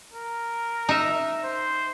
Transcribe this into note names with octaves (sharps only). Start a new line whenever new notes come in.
A#4
D#4 E5
C5